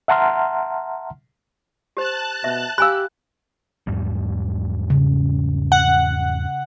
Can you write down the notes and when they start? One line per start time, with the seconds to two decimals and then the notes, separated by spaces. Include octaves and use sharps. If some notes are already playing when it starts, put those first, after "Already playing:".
0.08 E5 F#5 A5 A#5 C6 F6
1.97 G4 C5 A5 F#6
2.44 B2 E5
2.78 G4 F5 G#5 B5 E6 F#6
3.87 E2 G#2 G3
4.90 C#3
5.72 F#5